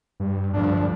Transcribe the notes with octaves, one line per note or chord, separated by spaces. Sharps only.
G2
D2 G2 F3 D4